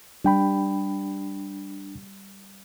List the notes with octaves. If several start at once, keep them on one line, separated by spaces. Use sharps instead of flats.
G3 D4 G5 B5